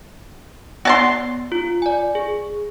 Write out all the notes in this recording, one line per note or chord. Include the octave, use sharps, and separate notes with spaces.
B3 F#4 C#5 D5 A5 C6
F4
D5 G#5
G#4